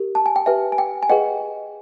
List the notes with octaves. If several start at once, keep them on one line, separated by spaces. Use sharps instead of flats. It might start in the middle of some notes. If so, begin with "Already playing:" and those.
Already playing: G4 A#4
A5
G#5
G5
G4 B4 E5 G5 G#5
G#5
G5
G#5
G#4 B4 D#5 F#5 G5